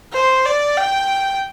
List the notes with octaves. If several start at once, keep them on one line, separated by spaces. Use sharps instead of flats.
C5
D5
G5